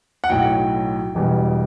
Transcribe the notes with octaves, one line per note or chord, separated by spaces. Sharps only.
F#5
B1 A2 F#3 G5
E1 E2 B2 G3